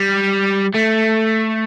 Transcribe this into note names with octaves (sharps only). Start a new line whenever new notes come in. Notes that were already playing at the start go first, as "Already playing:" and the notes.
Already playing: G3
A3